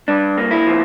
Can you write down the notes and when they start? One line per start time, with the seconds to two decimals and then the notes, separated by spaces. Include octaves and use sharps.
0.08 G2 D4
0.38 A#3
0.51 E4
0.67 F3